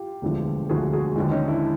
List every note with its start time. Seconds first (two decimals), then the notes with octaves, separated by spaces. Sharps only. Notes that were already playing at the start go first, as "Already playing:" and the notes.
Already playing: F4 G4
0.22 E1 D2 D3 F3
0.69 E1 D2 D3 F3 F#4 G#4
0.93 F#4 G#4
1.16 D#2 D3 F3 G#3
1.31 C#4 D#4
1.48 D4 E4